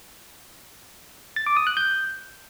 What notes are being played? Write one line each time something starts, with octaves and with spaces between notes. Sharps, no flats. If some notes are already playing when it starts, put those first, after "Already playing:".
A6
D6
D#6
F#6
G6